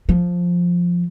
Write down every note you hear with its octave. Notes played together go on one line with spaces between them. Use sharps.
F3